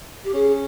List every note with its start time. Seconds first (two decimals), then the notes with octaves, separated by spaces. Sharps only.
0.24 G4
0.34 C#4 G#4